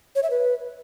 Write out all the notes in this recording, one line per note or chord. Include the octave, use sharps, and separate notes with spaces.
C#5
E5
B4